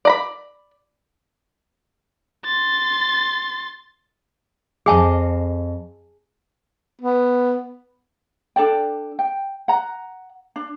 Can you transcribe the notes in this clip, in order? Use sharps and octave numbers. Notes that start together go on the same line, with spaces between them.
D5 A#5 B5
C6 A6
F2 G#4 D#5 F5 G#5 A5
B3
D4 A4 D5 G5
G5
F#5 A#5
D4